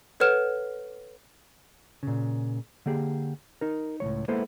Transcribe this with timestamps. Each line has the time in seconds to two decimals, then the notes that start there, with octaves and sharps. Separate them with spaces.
0.20 A4 B4 C#5 F#5 F6 E7
2.03 A#2 C#3
2.86 D3 A#3 G4 G#4
3.61 D#4 A#4
4.00 C#2 A2 F#3 C#5
4.28 G#3 A#3 B3 E4 A4 C5